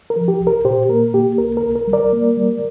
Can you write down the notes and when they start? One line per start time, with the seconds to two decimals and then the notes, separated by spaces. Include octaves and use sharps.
0.10 A#4
0.16 F3
0.28 G4
0.40 C2
0.47 A#4
0.65 A#2 G4 C5
0.89 A#3 A#4
1.14 A#3 G4
1.38 C2 A#4
1.57 A#4
1.63 C2
1.76 A#4
1.87 G3
1.93 A#4 D5
2.13 A#3
2.37 G3